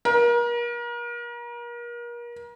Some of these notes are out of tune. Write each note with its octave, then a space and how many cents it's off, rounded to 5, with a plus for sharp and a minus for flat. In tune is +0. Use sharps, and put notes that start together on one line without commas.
A#4 +35